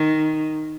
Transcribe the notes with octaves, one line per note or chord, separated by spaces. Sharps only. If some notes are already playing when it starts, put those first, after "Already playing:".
Already playing: D#3